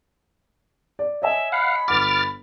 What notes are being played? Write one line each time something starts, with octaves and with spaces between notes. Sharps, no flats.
D5
C#5 D#5 E5 G#5
F5 F#5 B5
G1 F#5 D6 F6 A6